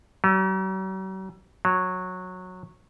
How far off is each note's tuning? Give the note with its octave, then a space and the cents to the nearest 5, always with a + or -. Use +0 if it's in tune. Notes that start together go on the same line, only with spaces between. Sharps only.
F#3 +45
F#3 -15